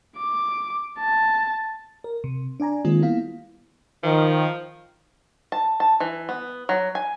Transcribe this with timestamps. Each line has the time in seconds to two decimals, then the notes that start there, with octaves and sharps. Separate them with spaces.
0.18 D6
0.99 A5
2.04 A#4
2.24 C3
2.60 D4 D5 G#5 A#5
2.85 D#3 G#3 A#3 C4 F4
3.02 G3 A#3 B3 E4 F5
4.03 D#3 F3
5.52 A5
5.80 A5
6.00 E3
6.29 B3
6.69 F#3
6.95 G#5